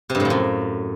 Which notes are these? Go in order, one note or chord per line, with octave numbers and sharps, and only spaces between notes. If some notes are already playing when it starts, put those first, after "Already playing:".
C3
G2
A2
F3
F#2